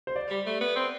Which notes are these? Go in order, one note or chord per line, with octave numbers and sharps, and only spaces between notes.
C5
D5
G3
A3
B3
C4